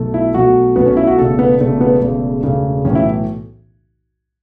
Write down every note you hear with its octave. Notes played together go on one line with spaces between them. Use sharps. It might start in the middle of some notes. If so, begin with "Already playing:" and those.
Already playing: B1 B2 A3
E4
B1 B2 A3 F#4
B1 B2 A3 B3
C#4
E4
F#4
E1 E2 C#3 A3 A4
B3
E1 E2 C#3 A3
B3
E1 E2 C#3 A3
E1 E2 C#3 A3
B1 A2 E3 A3 C#4
E4